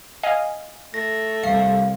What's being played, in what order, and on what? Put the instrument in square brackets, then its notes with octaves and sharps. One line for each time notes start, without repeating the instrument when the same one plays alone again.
[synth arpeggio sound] D#5 F5 G#5
[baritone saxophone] A3 [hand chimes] A#6
[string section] C2 [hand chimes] F5 [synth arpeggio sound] C7